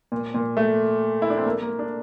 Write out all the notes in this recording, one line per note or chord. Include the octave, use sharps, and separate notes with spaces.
A#2
A#2
A3
E4
D4
C4
A#3
A#3
D4